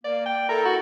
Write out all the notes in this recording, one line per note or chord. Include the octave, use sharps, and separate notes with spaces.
A#3 D5
G5
E4 A4 A#4
F#4